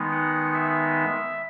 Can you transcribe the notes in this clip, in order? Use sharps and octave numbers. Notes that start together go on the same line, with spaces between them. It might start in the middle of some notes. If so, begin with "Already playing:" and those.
Already playing: D#3 G#3 B3 D#4
F#5
E5